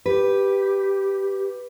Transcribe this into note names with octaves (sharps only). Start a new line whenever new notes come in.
G4 B4